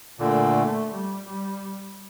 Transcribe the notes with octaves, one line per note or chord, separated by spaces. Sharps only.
A#2 D3 A3
G3
G3